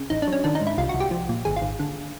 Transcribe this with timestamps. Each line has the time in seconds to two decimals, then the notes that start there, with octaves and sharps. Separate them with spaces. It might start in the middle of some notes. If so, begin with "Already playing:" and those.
Already playing: C#3
0.10 A1 D#4
0.22 D4
0.27 F#3
0.32 C#4
0.44 D#3 D4
0.55 D#4
0.61 G#2
0.67 E4
0.78 C2 F4
0.89 F#4
0.94 C2
1.00 G4
1.11 F3
1.29 A#2
1.45 G#1 G#4
1.56 F4
1.62 G#1
1.79 D3